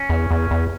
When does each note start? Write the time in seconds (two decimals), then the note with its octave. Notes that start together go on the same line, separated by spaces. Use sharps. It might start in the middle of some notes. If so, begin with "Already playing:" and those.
Already playing: C#4
0.10 E2
0.31 E2
0.51 E2